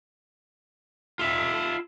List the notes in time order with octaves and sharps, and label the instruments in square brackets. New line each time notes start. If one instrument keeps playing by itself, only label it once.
[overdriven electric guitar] F4 E5